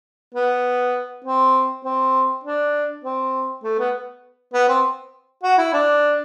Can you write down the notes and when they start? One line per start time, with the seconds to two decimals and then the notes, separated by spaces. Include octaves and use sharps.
0.34 B3
1.24 C4
1.84 C4
2.44 D4
3.04 C4
3.64 A3
3.79 B3
4.53 B3
4.69 C4
5.43 F#4
5.58 E4
5.73 D4